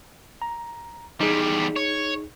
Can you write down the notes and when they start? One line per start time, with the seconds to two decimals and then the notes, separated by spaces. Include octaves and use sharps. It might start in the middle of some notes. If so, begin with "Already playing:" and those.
0.42 A#5
1.21 E2 G3 D#4 G#4
1.76 C#5